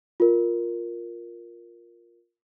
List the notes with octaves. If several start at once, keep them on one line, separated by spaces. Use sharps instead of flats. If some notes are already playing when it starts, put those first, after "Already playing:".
F4 A#4